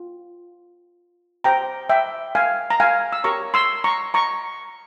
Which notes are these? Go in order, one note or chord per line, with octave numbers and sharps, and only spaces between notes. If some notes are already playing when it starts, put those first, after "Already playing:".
Already playing: F4
G4 C5 G5 A#5
E5 G5
F5 G#5
A#5
F5 G#5
E6
G4 A#4 C#5 A#5 C#6
C6 E6
A#5 C#6
A#5 C#6